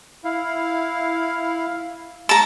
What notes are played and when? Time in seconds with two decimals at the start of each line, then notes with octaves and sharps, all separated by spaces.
0.24 E4 F5
2.29 G#3 A5 A#5